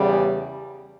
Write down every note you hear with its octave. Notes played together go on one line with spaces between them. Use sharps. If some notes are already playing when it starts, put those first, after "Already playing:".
Already playing: E2 C#3 G3